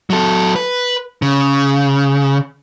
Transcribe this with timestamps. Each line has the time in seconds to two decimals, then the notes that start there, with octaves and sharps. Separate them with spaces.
0.10 F#3 A4
0.56 B4
1.22 C#3